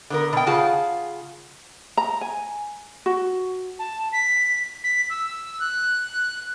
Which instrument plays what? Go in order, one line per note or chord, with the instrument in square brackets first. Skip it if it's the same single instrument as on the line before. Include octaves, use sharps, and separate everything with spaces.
[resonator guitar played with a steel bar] D3 B3 A#4
B2 G5
C#3 F4 G#4 F#5 A5
[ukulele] A#5
G#5
F#4
[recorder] A5
B6
B6
E6
F#6